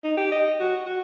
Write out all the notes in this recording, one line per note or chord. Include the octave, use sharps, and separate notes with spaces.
D#4
G4
D#5
F#4
F#4